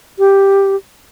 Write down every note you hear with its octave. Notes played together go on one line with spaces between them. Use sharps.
G4